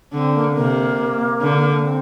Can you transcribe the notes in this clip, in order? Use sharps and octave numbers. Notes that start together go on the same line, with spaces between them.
D3 C4
A#3
C4
C3 A#3
D3
C4